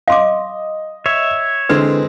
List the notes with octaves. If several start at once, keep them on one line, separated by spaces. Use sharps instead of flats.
D#5 F5 C6 D6
C#5 E5
D3 E3 G#3 C4 B4